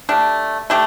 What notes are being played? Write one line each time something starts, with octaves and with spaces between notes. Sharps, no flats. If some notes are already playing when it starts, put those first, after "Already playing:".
A3 D4 G4
A3 D4 G4